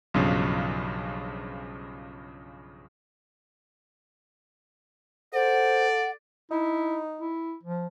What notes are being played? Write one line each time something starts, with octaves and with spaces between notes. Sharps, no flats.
B1 G2 C#3 F3
A4 C5 D5 F#5
D#4 E4
E4
F3